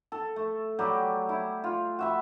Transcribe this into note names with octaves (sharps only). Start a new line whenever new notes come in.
A4
A3
F#3 G3 G4
E4
F4
F#4 E5 B5